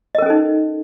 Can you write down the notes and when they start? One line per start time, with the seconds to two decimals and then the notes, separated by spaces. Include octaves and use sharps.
0.15 D#5
0.18 A#4
0.22 C#4
0.26 A4
0.30 D#4